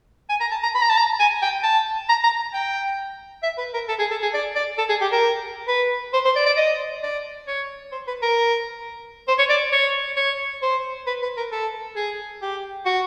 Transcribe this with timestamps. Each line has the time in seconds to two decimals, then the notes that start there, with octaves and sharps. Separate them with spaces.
0.29 G#5
0.40 A#5
0.51 A5
0.63 A#5
0.75 B5
0.81 A#5
0.89 A5
0.97 A#5
1.19 G#5
1.42 G5
1.63 A5
2.09 A#5
2.23 A#5
2.53 G5
3.43 E5
3.58 B4
3.74 A#4
3.88 A4
3.99 G#4
4.11 A4
4.22 G#4
4.34 D5
4.55 D5
4.78 A4
4.89 G#4
5.01 G4
5.12 A#4
5.68 B4
6.13 C5
6.25 C5
6.36 D5
6.46 D5
6.57 D#5
7.03 D5
7.47 C#5
7.92 C5
8.07 B4
8.22 A#4
9.28 C5
9.39 C#5
9.49 D5
9.72 C#5
10.16 C#5
10.62 C5
11.07 B4
11.22 B4
11.37 A#4
11.52 A4
11.96 G#4
12.42 G4
12.86 F#4